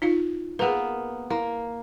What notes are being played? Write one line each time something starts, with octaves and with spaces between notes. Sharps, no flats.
D#4 F4 F5
A#3 B3 G#4 A#4 B4
A#3 E4